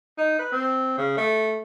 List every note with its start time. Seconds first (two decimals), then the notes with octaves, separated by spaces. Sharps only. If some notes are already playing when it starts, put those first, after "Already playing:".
0.18 D#4
0.39 B4
0.52 C4
0.98 C#3
1.17 A3